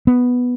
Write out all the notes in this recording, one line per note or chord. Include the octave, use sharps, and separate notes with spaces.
B3